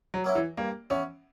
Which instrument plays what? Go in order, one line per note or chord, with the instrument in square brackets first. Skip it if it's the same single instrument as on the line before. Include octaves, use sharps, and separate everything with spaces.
[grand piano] F#3
[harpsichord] F#3 A#3 C#4 E4
[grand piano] E3
[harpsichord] G2 [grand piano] A#3
[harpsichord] E3 B3 [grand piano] C#4